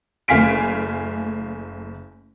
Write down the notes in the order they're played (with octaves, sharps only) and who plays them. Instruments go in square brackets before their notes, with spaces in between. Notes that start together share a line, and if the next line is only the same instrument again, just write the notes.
[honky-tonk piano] F#1 A3 F5 G#5 B6 D7